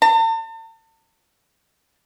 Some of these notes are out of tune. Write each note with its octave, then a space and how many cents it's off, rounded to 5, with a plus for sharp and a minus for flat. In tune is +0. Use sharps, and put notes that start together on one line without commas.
A5 +40